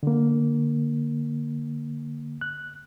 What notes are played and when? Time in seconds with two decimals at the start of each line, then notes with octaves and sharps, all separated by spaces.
0.03 D3 A#3
2.41 F#6